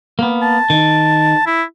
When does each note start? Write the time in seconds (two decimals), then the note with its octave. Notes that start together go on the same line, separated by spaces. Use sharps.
0.19 A#3 B3
0.42 A5
0.70 D#3
1.47 E4